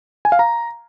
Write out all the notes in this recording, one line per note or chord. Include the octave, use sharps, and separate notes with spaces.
G#5
F5
A#5